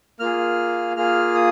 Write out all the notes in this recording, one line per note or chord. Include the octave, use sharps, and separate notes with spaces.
A#3 F4 G#4 F6
A#3 F4 G#4 F6
D#6